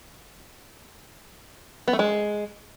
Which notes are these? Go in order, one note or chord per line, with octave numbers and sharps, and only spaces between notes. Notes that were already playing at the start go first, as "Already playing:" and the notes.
B3
A3
G#3